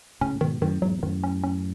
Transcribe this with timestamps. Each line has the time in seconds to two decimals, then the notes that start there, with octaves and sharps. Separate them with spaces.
0.21 A2 C#3 C#4
0.35 A2
0.41 G#2 B2 D#3
0.61 F#2 A2 D#3
0.82 E2 G#2 F#3
0.98 B2
1.03 F#2 A2 D#3
1.24 C#4
1.44 C#4